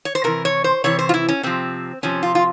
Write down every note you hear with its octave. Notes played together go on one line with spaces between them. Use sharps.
C#5
C5
C3 E3 A#4
C#5
C5
C3 E3 C#5
C5
F4
E4
C#4
C3 F3 C4
C3 F3 C#4
F4
F4